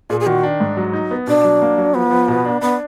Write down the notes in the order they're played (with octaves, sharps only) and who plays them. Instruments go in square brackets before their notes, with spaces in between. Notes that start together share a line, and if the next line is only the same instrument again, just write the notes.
[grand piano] A#2 [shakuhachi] G#4
[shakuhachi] G#4
[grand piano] D#3 [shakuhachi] F#4
[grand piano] D4
G#2
F#3
D#4
B3
[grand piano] B2 [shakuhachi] D4
[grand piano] F#3
A#3
F#3
[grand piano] F3 [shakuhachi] B3
[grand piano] F3
B2
D4
[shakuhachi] B3 [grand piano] D4